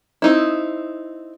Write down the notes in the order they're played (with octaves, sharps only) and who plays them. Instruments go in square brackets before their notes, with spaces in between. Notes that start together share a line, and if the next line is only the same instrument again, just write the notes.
[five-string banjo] C4 D#4 E4